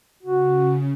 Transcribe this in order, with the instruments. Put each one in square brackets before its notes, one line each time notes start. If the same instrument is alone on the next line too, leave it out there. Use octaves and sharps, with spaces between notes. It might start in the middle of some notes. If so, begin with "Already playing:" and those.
[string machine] C#3 [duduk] F#4